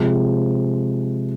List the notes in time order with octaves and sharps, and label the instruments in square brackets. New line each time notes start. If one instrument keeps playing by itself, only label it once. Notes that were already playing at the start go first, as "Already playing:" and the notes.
Already playing: [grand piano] C3 F3 G#3